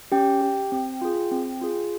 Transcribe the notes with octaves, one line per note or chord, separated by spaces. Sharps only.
C#4 G4 G5
G4
C4
F4 G#4
C4
F4 G#4